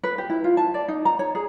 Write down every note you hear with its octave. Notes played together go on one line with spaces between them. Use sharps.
B4
G4
E4
F4
A5
D5
D#4
A#5
C#5
G#4